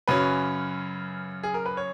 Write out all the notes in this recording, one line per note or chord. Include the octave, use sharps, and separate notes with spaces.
F#2 C#3 F#3 C#4 B4
G#4
A#4
B4
C#5